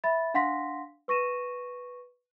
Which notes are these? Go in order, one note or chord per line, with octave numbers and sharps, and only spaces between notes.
E5 B5 A6
D4 F5 F#5 C6 A#6 B6
B4 C#6 A#6 D#7 E7